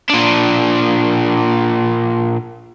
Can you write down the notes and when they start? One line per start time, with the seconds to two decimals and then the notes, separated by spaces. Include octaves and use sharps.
0.10 A#2 D4